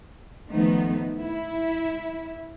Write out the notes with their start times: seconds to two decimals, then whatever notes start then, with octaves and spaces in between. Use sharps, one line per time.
0.51 D#3 F3 A3 B3 D#4
1.17 E4